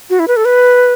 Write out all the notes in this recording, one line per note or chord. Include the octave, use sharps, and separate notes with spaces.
F#4
E4
B4
A4
B4